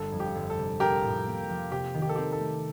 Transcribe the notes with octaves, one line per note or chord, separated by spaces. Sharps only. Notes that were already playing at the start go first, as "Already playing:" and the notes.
Already playing: G1 A4
F2
G4
G1
A4
C3
A#1 G4 A#4
A2
A#3
F3
C3 G4
D#3
G4
A4
C4 G4
A4
A3